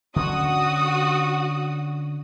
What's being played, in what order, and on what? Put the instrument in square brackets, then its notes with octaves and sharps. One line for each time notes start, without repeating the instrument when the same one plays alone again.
[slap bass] D3 C#4 [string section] F#4 D#6